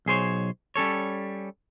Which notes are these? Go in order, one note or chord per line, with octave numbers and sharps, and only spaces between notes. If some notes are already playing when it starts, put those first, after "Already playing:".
B1 G#4 C5 C#5
G3 C#4 A4 C#5